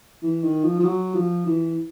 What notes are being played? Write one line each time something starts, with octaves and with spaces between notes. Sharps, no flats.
E3
D#3
F3
F3
F#3
F3
E3